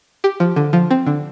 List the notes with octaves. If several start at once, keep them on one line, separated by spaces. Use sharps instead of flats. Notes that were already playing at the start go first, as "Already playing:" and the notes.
G4
F3
D3
F3
C4
D3